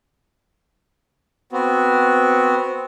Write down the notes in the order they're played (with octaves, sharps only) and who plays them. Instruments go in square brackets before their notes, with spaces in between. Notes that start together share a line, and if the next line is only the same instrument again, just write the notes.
[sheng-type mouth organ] B3 C4 F#4